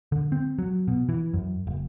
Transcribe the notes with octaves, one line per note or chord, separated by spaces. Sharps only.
D3
C4
F#3
B2
E3
F#2
F#1